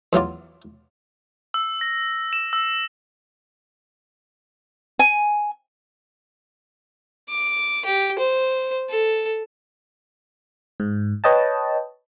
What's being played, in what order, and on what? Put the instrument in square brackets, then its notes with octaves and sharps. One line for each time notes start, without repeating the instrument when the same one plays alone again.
[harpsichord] E2 F#3 F4 D5
[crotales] E6
A#6
E7
E6
[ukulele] G#5
[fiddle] D6
G4
C5
A4
[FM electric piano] G#2
B4 C#5 D#5 G5 A5